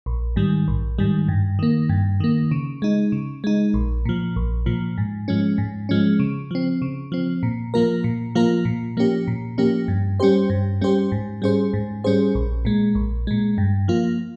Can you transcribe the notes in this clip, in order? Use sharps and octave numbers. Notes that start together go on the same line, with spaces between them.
A#1
G#2 D#3 G3
A#1
G#2 D#3 G3
G2
D#3 A#3
G2
D#3 A#3
C#3
G#3 D#4
C#3
G#3 D#4
A#1
A#2 F3
A#1
A#2 F3
G#2
F3 G#3 C#4
G#2
F3 G#3 C#4
C#3
F3 C4
C#3
F3 C4
A#2
F3 A#3 F4 A#4
A#2
F3 A#3 F4 A#4
A#2
F3 A#3 C#4 G4
A#2
F3 A#3 C#4 G4
G2
G3 C#4 G4 C5
G2
G3 C#4 G4 C5
G#2
G3 C#4 G#4 C5
G#2
G3 C#4 G#4 C5
A#1
A#2 G#3
A#1
A#2 G#3
G2
F3 A#3 F4